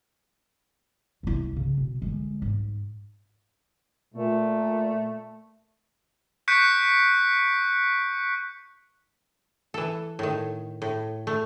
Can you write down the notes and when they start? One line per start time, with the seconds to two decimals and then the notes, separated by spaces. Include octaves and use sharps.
1.23 C2 E4
1.56 C#3
1.78 B2
2.02 D3 G#3
2.42 G#2
4.15 A#2 A3
6.48 C#6 F#6 G6 B6 C#7 D7
9.74 E3 A4
10.19 A2 D#3
10.82 A2
11.27 A3